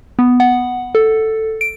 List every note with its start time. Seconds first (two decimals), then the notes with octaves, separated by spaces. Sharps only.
0.19 B3
0.40 F#5
0.95 A4
1.61 D7